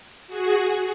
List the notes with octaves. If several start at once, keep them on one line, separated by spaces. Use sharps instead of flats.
F#4 G#4